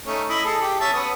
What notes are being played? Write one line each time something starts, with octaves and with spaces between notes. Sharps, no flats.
A3 C#4 D#4
E4 D#5 B5
G#4 A4
G4
C#4 E5 A5
B3 D#6